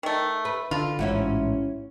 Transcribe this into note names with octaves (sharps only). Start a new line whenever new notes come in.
D#3 A3
B4
D3 F4
A1 G#2 C#4 E4 F#4